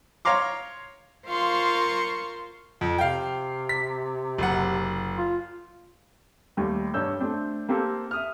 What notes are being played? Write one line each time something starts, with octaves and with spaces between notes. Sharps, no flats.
C#5 F5 A#5 C6 D6
F4 A#4 C5 F5 C6 C#6
F2
C3 F5 G5
B6
F#1 F#5
F4
D#2 G3 A3
G2 G3 C#5 E6 G6
A3 C4 D4
A#3 C4 G4 A4
E5 D#6 F6